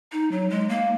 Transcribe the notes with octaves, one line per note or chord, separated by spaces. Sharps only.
D#4
F#3
G#3
A#3